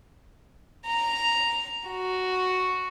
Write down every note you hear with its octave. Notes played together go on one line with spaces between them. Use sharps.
A#5
F#4